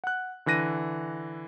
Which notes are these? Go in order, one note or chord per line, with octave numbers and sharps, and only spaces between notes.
F#5 F#6
D3 E3 F#6 A#6 D#7